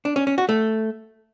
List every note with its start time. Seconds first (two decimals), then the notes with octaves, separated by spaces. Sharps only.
0.05 D4
0.16 C#4
0.27 C#4
0.38 F#4
0.49 A3